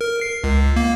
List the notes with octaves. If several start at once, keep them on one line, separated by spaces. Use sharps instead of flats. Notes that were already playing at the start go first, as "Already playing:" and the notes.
A#4
C7
C#2
A#3